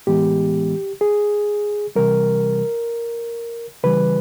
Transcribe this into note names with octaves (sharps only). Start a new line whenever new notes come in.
A2 E3 G#3 B3 G4
G#4
C3 E3 G3 A#4
C#3 E3 G3 B4